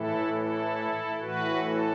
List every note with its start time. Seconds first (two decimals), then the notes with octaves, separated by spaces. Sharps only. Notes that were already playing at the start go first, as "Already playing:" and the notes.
Already playing: A2 E3 E4 A4
0.34 E4 A4
1.20 A2 E3 F#4 B4
1.64 A4